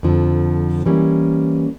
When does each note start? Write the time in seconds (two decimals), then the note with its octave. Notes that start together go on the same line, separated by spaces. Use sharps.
0.03 F2 D3 F3
0.86 E3 G3 A#3 C#4